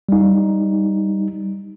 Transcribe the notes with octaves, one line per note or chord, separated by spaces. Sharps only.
G3 D#4